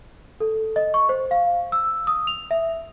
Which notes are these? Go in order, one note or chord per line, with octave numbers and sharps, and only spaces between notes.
A4
D#5
C#6
C5
F5
E6
D#6
F7
E5